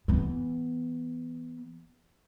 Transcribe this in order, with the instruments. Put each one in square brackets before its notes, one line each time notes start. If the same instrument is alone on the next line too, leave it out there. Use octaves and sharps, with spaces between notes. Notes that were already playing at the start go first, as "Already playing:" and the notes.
[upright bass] E3 B3